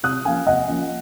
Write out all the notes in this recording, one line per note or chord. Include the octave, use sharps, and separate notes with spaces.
C3 D#6 F#6
F3 A#3 C#4 F5 G#5
C3 D#5 F#5
F3 A#3 C#4